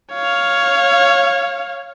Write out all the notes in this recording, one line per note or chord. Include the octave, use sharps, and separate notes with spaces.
C#5 F5